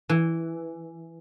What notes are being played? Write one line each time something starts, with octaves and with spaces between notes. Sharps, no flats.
E3